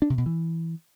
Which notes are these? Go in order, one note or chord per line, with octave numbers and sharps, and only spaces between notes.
D4
C3
B2
E3